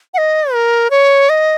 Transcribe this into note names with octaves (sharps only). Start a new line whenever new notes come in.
F#5
D#5
A#4
C#5
D#5